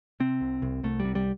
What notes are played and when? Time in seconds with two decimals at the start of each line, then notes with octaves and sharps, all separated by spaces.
0.20 C3 C4
0.41 C2
0.62 C2
0.84 C2 A3
1.00 G3
1.05 C3
1.15 G3